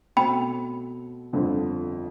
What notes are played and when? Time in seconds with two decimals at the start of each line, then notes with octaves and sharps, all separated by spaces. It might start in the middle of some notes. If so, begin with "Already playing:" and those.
0.16 B2 A3 C4 G5 B5
1.33 G1 F2 D3 F3